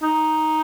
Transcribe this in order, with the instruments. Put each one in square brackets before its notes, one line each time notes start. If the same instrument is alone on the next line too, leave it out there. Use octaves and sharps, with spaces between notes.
[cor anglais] D#4